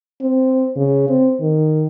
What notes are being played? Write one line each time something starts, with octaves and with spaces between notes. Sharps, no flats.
C4
C#3
C4
D#3